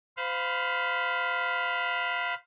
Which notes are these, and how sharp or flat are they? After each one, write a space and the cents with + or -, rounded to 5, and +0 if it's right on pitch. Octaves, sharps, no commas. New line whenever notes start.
C5 -30 F5 +5 B5 +0